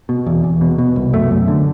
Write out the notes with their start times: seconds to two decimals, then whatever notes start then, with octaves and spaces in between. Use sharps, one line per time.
0.09 B2
0.26 E2
0.44 E2
0.61 B2
0.78 B2
0.96 C2
1.13 F#2 A3
1.31 F#2
1.48 D3